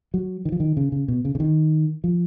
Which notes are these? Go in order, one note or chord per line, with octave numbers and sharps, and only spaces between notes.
F#3
D#3
F3
D#3
C#3
C#3
B2
C#3
C#3
D#3
F3